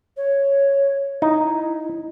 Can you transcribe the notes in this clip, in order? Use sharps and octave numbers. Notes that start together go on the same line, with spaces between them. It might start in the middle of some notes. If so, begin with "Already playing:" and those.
C#5
D#4 E4